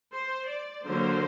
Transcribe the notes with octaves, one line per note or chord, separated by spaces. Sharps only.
C5
D5
D3 F#3 A#3 C5